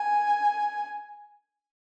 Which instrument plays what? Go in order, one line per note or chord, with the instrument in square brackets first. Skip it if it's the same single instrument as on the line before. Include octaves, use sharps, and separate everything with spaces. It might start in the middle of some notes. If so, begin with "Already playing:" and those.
Already playing: [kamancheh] G#5